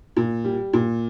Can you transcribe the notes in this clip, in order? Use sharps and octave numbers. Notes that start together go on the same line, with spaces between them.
A#2
G3
A#2